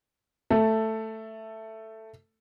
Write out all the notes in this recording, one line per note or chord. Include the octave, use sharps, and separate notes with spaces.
A3 A4